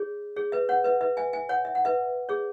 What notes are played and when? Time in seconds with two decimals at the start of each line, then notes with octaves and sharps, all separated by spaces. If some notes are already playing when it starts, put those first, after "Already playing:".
Already playing: G#4 C#5
0.36 G#4 C#5
0.52 B4 E5
0.69 C#5 F#5
0.84 B4 E5
1.01 B4 E5
1.17 E5 G#5
1.33 E5 G#5
1.49 C#5 F#5
1.65 E5
1.75 F#5
1.85 B4 E5
2.29 G#4 C#5